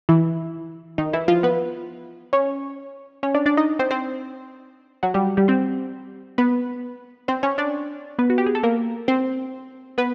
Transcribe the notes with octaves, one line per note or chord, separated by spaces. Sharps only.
E3 E4
D#3 D#4
E3 E4
F3 F4
B3 B4
C#4 C#5
C#4 C#5
D4 D5
D4 D5
D#4 D#5
C4 C5
C4 C5
F#3 F#4
G3 G4
G3 G4
C4 C5
B3 B4
C4 C5
C#4 C#5
D4 D5
B3 B4
F#4
G4
G#4
A4
A#3 A#4
C4 C5
B3 B4